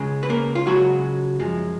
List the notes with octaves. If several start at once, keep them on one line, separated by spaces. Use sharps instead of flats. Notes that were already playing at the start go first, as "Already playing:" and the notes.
Already playing: C#2 C#3 G#3
B4
A#3 A#4
F4
C#2 C#3 F#3 G#3 F#4
F#2 F3 G#3